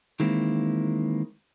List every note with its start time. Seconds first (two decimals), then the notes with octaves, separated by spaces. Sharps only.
0.20 D#3 E3 G#3 A#3 C4 E4